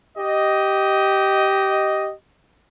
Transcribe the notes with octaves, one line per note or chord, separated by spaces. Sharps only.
G4 D#5